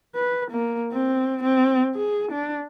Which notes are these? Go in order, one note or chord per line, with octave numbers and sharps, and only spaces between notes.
B4
A#3
C4
C4
G#4
D4